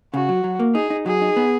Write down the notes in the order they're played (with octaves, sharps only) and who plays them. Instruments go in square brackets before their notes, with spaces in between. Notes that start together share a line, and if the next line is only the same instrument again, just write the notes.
[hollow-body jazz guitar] C#3 [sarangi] F#4
[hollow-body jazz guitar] F#3
F#3
A#3
[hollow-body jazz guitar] D#4 [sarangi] G#4
[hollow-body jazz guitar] D#4
[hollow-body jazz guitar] F#3 [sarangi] G#4
[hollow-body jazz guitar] D#4
B3